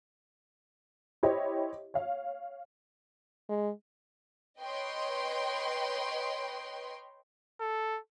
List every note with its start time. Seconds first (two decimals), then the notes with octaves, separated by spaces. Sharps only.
1.23 E4 G4 C5 C#5 D#5
1.94 C#5 F5
3.49 G#3
4.61 B4 C#5 D#5 G5 C6
7.61 A4